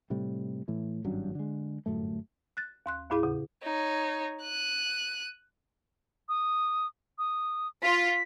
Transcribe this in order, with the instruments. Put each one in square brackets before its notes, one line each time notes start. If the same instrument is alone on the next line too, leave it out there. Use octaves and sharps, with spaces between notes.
[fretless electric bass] A2 C3 G3
A2 E3
G#1 G2 F#3 C#4
D3 G#3
G1 F#2 A2 A3
[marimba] F#6 A6
D#2 C6 F#6
D#2 A2 E4 G#4 F5 B5
E2 C#3
[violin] D#4 C#5
F#6 D#7
[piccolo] D#6
D#6
[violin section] F4 [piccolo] B6